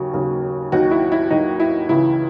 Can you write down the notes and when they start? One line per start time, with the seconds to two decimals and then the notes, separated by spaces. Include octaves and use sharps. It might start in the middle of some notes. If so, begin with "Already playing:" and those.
Already playing: D#2 C#3 F#3
0.14 D#2 C#3 F#3
0.72 D#2 D#3 F#3 F#4
0.91 E4
1.12 E4
1.30 D#2 D#3 F#3 D#4
1.60 E4
1.89 C#2 C#3 E3 E4